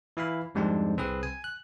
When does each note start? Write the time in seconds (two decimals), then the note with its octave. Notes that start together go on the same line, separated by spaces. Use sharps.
0.17 E3 E4 F5 B5
0.55 F2 G#2 G3 G#3 C4 D4
0.97 C2 C4 G#4 B4
1.23 G#5
1.44 F#6